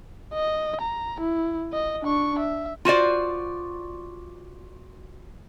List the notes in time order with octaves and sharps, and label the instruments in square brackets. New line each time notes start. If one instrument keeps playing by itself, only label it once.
[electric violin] D#5
A#5
E4
D#5
D4 C#6
E5
[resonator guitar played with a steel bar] F4 F#4 C5 D5